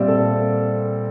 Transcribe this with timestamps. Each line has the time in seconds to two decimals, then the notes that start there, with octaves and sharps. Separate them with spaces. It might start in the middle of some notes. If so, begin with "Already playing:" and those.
Already playing: A#2 G3 C4 D5 E5
0.08 A4